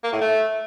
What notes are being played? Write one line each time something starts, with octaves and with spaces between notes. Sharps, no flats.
A#3
A2
A3